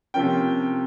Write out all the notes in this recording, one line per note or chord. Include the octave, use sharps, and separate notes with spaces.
C3 F3 A#3 C#4 G5